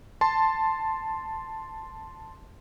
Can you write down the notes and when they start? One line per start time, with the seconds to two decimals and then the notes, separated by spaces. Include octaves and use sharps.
0.21 A5 C6